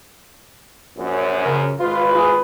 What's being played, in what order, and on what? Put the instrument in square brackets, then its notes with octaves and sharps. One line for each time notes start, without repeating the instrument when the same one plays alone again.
[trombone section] A#1 F#2
[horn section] C#3 A#4
[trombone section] G#1 B4 [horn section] F4
[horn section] F4 G#4